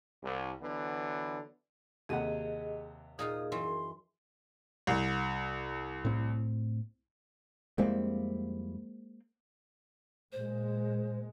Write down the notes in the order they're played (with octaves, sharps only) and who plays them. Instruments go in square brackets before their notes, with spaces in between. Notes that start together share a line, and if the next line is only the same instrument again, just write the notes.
[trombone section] C2
D3 E3 F#3 B3
[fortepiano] D#2 C3 F#5 [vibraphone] G#4 D#5
[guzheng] A#2 D#4 F4 [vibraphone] G#4 [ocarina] D#6
[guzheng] F#2 E3 [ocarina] C6
[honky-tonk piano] C2
[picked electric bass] A2 C4
[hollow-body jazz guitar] F2 G3 E4 [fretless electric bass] G#3 A#3 C4
[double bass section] A#2 G#3 [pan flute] C5